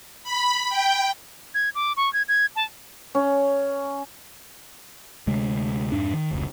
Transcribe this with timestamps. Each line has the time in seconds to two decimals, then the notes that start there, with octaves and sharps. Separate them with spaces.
0.23 B5
0.69 G5
1.54 G#6
1.75 D6
1.97 C#6
2.13 G#6
2.28 G#6
2.56 A5
3.15 C#4
5.27 D2 C3 G#3
5.92 F2 G#2 D4
6.13 D#3
6.31 F1 C#2